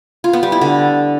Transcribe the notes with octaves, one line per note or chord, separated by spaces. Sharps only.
F4
B3
G3
E4
D3